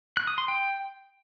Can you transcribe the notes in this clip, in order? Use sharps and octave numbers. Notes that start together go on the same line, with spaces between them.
F#6
D#6
C6
G5